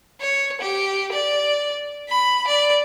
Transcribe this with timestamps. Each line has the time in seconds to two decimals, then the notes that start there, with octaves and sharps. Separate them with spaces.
0.21 C#5
0.61 G4
1.12 D5
2.09 B5
2.47 D5